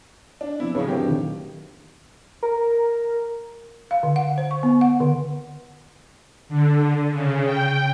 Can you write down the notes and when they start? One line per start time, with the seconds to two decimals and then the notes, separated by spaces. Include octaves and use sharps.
0.41 D4
0.60 F3 B3 C4 E4
0.75 F#2 A2 C#3 B4
0.88 D1 F#3 G4
1.09 A#2 D#3
2.43 A#4
3.91 F5
4.03 D3
4.16 F#5
4.38 C5
4.51 C#6
4.63 B3
4.81 F#5
5.00 D3
6.49 D3
7.11 C#3
7.44 G5